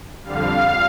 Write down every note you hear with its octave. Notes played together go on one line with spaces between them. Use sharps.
F2 D3 G3 F5